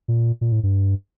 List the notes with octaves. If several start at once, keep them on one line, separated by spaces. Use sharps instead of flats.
A#2
A#2
A2
G2